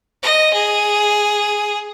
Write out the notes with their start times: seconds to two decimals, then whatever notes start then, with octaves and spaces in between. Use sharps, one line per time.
0.23 D#5
0.54 G#4